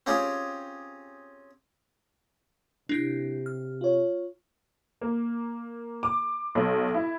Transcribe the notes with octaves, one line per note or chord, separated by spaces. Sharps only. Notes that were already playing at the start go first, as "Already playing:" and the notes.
C4 C#4 F4 G4 G#4
C3 D4 E4 G6
F6
F4 C#5
A#3
D6
B1
E4